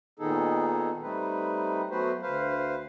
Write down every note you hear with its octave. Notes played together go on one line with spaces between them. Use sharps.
A#2 D#3 B3 D#4 G#4 A4
G3 A3 C4 D#4 B4
F#3 A3 B3 F#4 B4 C5
D2 B4 C5 F5